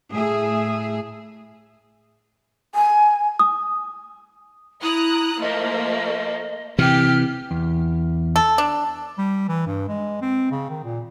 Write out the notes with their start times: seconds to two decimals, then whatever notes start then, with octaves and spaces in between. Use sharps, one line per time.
0.10 A2 G#4 E5
2.75 G#5
3.39 D#6
4.82 E4 A#5 D#6 F#6
5.40 F3 A3 A#3 D#5
6.79 C3 E3 G4 F6
7.51 E2
8.36 A4
8.58 D4
9.18 G3
9.48 E3
9.67 G2
9.89 G#3
10.21 C4
10.51 C#3
10.69 D#3
10.84 A#2